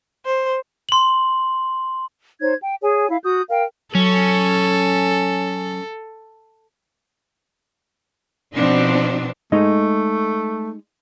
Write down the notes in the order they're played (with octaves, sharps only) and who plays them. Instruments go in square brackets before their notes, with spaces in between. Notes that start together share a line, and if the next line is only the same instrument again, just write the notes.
[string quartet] C5
[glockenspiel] C6 F#7
[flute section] D#4 C5 C#5 G#6
G5
G#4 C#5 G#5
E4 F5
F#4 D#6 G6
A#4 F5 G5
[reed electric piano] F#3 [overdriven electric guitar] C#4 [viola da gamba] A4
[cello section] B2 F3 C4 D4 D#4
[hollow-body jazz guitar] G#3 D#4 D#5 [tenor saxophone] A3